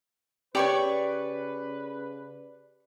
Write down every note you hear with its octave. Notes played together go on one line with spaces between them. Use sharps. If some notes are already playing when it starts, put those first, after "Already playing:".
C#3 G4 B4 C#5 D5 C#6